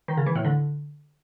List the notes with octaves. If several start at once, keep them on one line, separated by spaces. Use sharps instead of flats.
D#3
C#3
E3
A2
D3